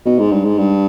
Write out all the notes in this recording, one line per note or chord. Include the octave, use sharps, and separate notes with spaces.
B2
G#2
G2
G#2
G2